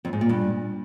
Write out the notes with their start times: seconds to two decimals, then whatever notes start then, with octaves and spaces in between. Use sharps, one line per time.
0.05 F2
0.13 G#2
0.21 A#2
0.29 G2